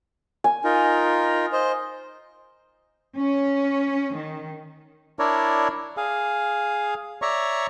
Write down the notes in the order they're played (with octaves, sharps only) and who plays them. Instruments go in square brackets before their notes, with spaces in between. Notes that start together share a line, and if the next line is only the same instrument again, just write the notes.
[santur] G#5
[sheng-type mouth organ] D#4 F4 A#4
C5 D#5
[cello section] C#4
D#3
[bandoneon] D4 E4 A#4 C#5 D5
G#4 F5
C#5 D5 E5 A#5 C#6